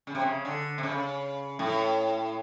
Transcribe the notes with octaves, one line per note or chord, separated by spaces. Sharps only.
C#3
C3
C#3
D3
C3
C#3
A2